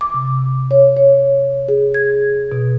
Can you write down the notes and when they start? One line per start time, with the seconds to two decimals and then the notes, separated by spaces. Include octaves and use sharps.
0.01 D6
0.14 C3
0.71 C#5
0.97 C#5
1.68 G#4
1.94 G#6
2.52 B2